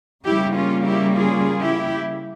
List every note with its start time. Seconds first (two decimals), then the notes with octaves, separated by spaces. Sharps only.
0.25 C#3 G3 A#3 E4 G4
0.55 C#4 F4
0.85 E4 G4
1.15 F4 G#4
1.61 E4 G4